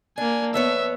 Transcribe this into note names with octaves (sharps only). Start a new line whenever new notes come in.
A#3 D4 G#5
F2 B3 C#5 E5